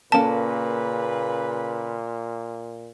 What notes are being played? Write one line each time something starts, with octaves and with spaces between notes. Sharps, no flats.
A#2 C#3 A#3 C#4 A4 B4 A5